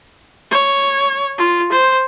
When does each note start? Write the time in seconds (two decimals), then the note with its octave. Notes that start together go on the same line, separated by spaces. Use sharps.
0.51 C#5
1.38 F4
1.72 C5